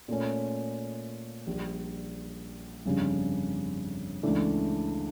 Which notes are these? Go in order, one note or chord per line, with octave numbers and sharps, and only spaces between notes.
A#2 A3 C#4
A#1 A#2 G3
G1 F2 C#3 G3 D4
C#2 C#3 E3 A3 D4